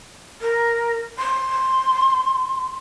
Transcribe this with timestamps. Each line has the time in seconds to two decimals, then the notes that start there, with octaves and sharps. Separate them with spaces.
0.42 A#4
1.19 C6